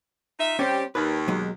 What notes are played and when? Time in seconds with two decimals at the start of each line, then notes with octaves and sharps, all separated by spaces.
0.40 D#4 F4 E5
0.59 G3 C4 C#4 G4
0.95 D#2 B4
1.28 B2 F#3 G#3